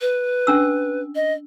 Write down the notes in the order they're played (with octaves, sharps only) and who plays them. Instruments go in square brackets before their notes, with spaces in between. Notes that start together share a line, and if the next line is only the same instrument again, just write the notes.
[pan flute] B4
[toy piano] C#4 D4 E6
[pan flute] D#5